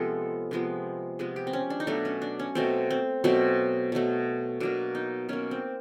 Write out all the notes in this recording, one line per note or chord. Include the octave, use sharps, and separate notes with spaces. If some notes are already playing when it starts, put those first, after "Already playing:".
Already playing: C3 F3 G#3 B3 A4
C3 F3 G#3 B3
C3 F3 G#3 B3 G#4
G4
C4
C#4
D4
D#4
B2 F#3 A3 D4
C#4
D4
C#4
B2 F#3 A3 C4
C4
B2 F#3 A3 C4
B2 F#3 A3
B2 F#3 A#3 D4
D#4
B2 F#3 A#3 C#4
C4